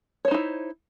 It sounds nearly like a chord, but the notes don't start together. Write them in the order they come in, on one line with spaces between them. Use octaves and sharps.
C#5 C5 D#4 E4